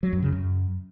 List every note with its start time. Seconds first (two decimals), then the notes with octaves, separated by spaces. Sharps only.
0.03 F#3
0.13 F#2
0.23 C#3
0.32 F#2